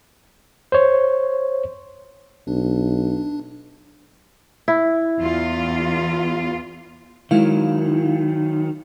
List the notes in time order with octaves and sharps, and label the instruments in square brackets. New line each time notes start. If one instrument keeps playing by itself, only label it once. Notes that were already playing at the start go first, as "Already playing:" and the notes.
[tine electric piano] C5 C#5
[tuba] B1 [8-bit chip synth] D4
[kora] E4
[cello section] E2 F4
[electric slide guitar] D#3 F#3 [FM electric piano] G#3 E4 F5